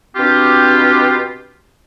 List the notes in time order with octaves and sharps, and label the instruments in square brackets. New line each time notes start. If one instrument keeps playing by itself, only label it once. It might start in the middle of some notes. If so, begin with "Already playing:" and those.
[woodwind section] B2 C4 D4 F4 G4